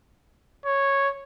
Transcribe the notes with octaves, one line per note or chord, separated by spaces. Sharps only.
C#5